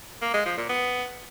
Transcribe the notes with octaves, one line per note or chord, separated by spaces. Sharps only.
A#3
G#3
F3
A#2
B3